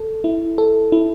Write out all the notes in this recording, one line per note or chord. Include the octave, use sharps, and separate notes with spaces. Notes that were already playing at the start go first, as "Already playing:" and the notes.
Already playing: A4
E4
A4
E4